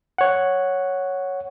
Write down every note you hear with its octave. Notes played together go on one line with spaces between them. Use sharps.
C#5 F#5